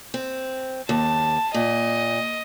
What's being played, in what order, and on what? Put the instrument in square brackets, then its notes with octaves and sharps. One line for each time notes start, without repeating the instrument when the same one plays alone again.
[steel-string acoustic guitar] C4
[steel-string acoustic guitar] D#2 [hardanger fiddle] A5
[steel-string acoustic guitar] A#2 [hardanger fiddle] D#5